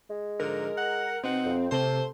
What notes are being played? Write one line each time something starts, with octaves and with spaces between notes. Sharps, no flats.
G#3
G#2 D3 F3 A#4
F#5
B2 C4 D#4 F#5
F2
C3 A3 A4 C5